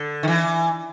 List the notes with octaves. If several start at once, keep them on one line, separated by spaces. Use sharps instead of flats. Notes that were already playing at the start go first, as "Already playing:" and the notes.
Already playing: D3
D#3
E3